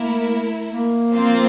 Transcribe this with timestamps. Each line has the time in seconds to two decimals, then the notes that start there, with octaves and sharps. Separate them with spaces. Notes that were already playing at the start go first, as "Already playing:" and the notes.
Already playing: A3 A#3 E4 A#4
0.72 A#3
1.13 F3 C4 F4 C5